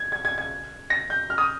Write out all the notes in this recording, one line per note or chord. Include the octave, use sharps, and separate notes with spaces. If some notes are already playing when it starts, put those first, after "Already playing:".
Already playing: G#6
G#6
G#6
G#6
A#6
G6
F6
D#6